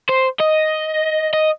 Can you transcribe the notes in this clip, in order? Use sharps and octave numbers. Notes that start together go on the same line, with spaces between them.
C5
D#5
D#5